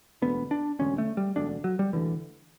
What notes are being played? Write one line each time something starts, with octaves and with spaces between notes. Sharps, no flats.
E1 D2 D3 B3
D4
E1 D2 D3 C#4
A3
G3
E1 D2 D3 D4
F#3
G3
E1 D2 D3 E3